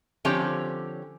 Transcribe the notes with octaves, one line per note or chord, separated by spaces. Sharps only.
D3 F3 C4 C#4 G4 C#5